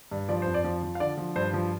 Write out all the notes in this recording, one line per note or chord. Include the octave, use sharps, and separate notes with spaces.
G2
F3 D5
F2 C5
D5
F3
F3
F5
D3 D5
F3
G2 C5
F3